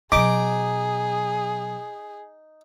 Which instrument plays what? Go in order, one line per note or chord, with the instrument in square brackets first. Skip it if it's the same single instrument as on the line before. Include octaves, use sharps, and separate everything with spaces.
[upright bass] B2 F#3 [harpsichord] D#4 [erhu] G#4 [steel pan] D6